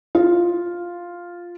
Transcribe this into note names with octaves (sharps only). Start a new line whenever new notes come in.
F4